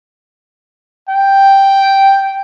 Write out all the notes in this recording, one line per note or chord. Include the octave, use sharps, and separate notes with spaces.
G5